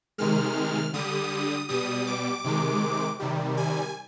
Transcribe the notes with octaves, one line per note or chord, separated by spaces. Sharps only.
C3 D#3 G#3 F6
D3 G3 D#6
B2 G3 D#6
D6
C3 D#3 G#3
C3 D#3 G3
G#5